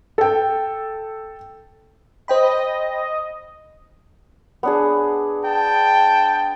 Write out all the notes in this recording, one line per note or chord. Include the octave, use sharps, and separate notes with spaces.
A4 G5
C5 D#5 G5 B5
B3 D4 G#4
G5 A5